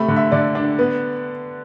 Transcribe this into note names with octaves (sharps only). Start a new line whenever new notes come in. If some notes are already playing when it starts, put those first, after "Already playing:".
Already playing: C3 A3 B5
D3
E5
D3 D5
D4
B3